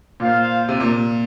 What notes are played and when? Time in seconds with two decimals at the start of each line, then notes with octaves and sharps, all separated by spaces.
0.20 A#2 F4 C5 F5
0.69 C3
0.80 A#2